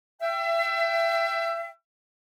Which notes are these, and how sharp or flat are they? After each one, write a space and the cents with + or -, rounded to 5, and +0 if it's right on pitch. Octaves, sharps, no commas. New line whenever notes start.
E5 +30 G5 +0